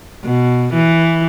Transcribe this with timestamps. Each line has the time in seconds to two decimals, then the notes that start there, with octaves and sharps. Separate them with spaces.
0.24 B2
0.73 E3